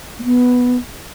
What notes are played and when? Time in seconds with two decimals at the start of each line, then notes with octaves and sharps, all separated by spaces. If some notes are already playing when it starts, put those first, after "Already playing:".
0.19 A#3
0.24 B3